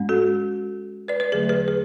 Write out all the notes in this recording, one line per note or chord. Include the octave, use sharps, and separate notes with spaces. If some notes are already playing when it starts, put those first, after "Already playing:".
Already playing: G#2 G#3 C#4
F#4 A4
B4 D5
B4 D5
E2 D3 F#3 A3 G#4 B4
G#4 B4
G#4 B4